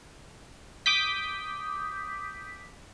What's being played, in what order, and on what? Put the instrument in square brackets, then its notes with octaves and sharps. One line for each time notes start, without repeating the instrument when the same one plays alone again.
[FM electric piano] D6 D#6 G6 B6